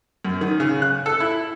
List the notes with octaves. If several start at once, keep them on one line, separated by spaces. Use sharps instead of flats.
F#2
D#3
C#3
F#6
A4
E4